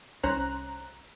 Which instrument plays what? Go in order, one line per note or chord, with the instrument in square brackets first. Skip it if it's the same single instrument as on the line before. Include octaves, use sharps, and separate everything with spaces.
[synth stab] C2 C#4 C5 A#5 F#6